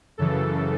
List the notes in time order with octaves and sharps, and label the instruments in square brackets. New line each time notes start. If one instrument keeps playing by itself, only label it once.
[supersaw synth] F#2 C#3 E3 A4